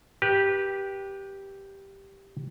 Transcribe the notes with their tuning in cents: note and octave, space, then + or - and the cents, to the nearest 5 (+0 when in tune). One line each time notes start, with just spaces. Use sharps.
G4 +0 B4 -25